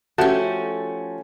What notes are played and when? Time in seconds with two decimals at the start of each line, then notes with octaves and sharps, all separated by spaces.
0.18 F3 A3 C#4 F#4 G4 F#5 A5